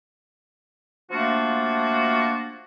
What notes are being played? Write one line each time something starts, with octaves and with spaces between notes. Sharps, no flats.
F3 A3 A#3 D4 F4 F#4